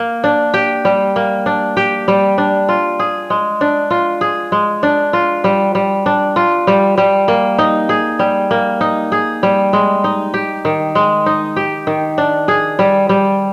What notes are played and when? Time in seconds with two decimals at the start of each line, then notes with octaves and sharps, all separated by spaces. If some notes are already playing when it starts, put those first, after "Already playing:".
Already playing: A#3
0.24 D4
0.54 G4
0.85 G3
1.16 A#3
1.46 D4
1.77 G4
2.08 G3
2.38 D4
2.69 F4
2.99 G#4
3.30 G#3
3.61 D4
3.90 F4
4.21 G#4
4.52 G#3
4.83 D4
5.13 F4
5.44 G3
5.75 G3
6.06 D4
6.36 F4
6.67 G3
6.98 G3
7.28 A#3
7.58 D#4
7.89 G#4
8.19 G3
8.51 A#3
8.81 D#4
9.12 G#4
9.43 G3
9.73 G#3
10.04 D#4
10.34 G4
10.65 D#3
10.95 G#3
11.26 D#4
11.56 G4
11.87 D#3
12.18 D4
12.48 G#4
12.79 G3
13.09 G3